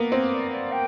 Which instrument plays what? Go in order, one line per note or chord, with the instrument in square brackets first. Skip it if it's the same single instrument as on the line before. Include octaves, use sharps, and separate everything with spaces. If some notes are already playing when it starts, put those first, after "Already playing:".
Already playing: [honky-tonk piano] A#3 B3
C4
[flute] D5
D5
G5